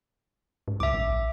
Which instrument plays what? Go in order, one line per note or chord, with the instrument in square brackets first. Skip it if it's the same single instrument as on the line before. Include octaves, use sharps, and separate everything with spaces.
[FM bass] G#2
[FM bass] C#2 [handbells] E5 D6
[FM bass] A#1